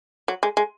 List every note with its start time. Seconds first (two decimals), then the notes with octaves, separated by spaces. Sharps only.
0.28 F#3
0.43 G#3
0.57 G#3